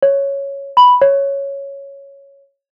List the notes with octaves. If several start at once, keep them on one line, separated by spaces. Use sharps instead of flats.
C#5
B5
C#5